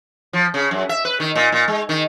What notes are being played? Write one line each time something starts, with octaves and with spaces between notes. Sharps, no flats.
F3
C#3
F#2
E5
B4
D#3
A#2
A#2
G#3
D#3